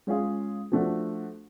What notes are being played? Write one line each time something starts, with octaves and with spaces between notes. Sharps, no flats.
G#3 C#4 F4 G#4
F3 A3 D4 F#4